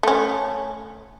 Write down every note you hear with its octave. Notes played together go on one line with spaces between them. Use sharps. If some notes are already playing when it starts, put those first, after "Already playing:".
A3 C#4